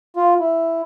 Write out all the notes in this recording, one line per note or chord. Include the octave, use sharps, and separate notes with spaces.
F4
E4